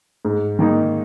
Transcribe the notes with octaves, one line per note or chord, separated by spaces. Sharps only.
G#2
D#3 A#3 D#4